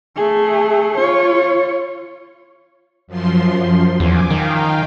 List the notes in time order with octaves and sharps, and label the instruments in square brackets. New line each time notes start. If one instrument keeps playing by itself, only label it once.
[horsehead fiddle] A3 G#4
F4 C#5
[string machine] F#2 F3 C6
[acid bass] E2 [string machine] G#5 D6
[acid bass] D#3 [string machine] F5 G5